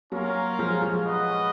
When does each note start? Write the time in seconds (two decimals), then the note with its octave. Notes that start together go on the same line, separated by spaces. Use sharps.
0.12 F#3 A#3 C#4 F4 A#4 F5
0.59 F3 G#3
0.82 F3 G#3
1.05 C#4 F#4 B4 D#5